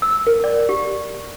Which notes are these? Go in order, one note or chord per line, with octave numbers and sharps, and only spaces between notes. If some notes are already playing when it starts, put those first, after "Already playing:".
E6
A#4
D5
G4